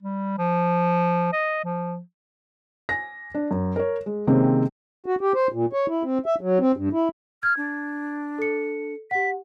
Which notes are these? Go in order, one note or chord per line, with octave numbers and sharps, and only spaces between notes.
G3
F3
D#5
F3
G#5 A#6
D4
F#2
A#4 C#5
G#3
C3 D#3 G#3 A#3 C4 C#4
F#4
G4
C5
A#2
C#5
E4
C4
E5
F#3
C4
G2
E4
F6 G#6
D4
A4 C#7
G4 F#5 B6